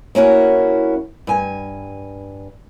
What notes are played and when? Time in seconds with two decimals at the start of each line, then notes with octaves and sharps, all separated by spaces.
0.15 A#3 C#4 E4 F#4
1.27 G2 G#5